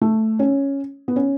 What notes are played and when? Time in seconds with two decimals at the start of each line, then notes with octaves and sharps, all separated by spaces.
0.01 A3
0.39 C#4
1.08 B3
1.16 C#4